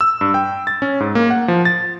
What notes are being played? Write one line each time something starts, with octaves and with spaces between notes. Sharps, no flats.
E6
G2
G5
A6
C#4
G#2
A#3
F#5
F3
A6